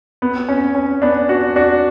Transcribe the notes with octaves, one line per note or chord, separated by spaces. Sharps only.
B3
C#4
C#4
B3 D4
D4 F#4
D4 F#4